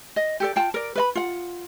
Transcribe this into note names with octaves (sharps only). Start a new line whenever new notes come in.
D#5
G4 A4 D5
F4 G5 A5
A#4 D5
B4 D#5 B5
F4 F#5